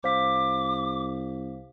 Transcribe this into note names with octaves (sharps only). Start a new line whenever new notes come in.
C2 C5 F5 D6 B6